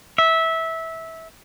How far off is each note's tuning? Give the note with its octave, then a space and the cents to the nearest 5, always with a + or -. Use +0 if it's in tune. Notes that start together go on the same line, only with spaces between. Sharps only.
E5 -15